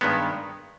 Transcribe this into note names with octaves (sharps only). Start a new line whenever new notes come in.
G2 D#3 G#3 B3